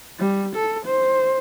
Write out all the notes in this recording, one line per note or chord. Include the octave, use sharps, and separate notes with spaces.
G3
A4
C5